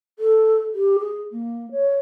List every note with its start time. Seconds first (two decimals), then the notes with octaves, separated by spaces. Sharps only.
0.19 A4
0.74 G4
0.99 G#4
1.32 A#3
1.71 C#5